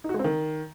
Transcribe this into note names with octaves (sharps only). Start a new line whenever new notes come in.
D#4
F#4
G#3
C4
D#3